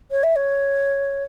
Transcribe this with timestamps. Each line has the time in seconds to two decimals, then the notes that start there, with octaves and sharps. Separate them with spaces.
0.11 C#5
0.23 E5
0.36 C#5